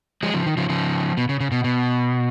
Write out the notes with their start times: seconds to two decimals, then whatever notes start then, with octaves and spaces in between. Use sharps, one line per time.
0.23 F3 G#3
0.34 C#3 F3
0.46 D#3
0.57 C#3 F3
0.69 C#3 F3
1.17 B2
1.29 C#3
1.40 C#3
1.52 B2
1.64 B2